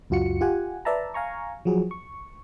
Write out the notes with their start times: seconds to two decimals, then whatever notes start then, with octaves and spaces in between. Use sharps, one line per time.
0.10 C#2 F#2 F4 F#4 C#7
0.41 F4 G4 F#5 G#5
0.85 B4 D5 E5 A5 A#5
1.14 F5 G#5 A#5 C#6
1.65 F3 F#3 F#4 G#4
1.91 C#6